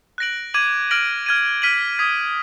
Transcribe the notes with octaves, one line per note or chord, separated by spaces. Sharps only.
F#6 A#6 D7 F#7
D6 G#6 D#7 F#7
F6 A#6 D7 F#7
F6 G#6 D#7
F6 B6 D#7 F#7
D#6 G#6 B6